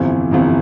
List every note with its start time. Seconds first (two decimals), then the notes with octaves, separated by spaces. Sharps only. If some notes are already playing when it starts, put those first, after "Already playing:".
Already playing: G1 F2 C3 E3
0.31 G1 F2 C3 E3